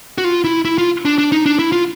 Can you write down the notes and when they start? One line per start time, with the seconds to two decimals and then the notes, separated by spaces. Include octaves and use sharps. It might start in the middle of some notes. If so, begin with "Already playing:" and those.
0.18 F#4
0.24 F4
0.44 E4
0.65 E4
0.78 F4
1.05 D4
1.18 D4
1.32 D#4
1.46 D4
1.59 E4
1.72 F4